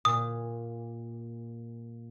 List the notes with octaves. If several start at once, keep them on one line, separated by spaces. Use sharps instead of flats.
A#2 D#6